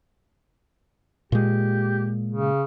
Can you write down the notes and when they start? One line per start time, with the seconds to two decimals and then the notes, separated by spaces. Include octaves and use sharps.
1.32 A#2 G#3 G4
2.32 C#3